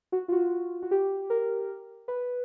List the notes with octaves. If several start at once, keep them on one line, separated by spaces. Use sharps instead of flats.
F#4
F4
F#4
F#4
G4
A#4
B4